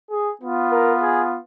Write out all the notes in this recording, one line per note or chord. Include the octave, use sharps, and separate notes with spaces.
G#4
B3 F4
A#4
G#4